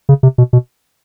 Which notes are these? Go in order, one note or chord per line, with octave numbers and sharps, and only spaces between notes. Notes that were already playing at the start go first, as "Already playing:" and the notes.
C#3
C3
B2
B2